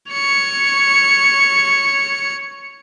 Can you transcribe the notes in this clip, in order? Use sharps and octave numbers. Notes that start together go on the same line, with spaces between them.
C#5 C#7